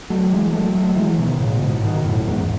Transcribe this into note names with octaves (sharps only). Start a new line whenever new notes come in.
F#3 A3
E3 G#3
F#3 A3
F#3 A3
E3 G#3
B2 D#3
A2 C#3
G#2 B2
B2 D#3
F#2 A2
E2 G#2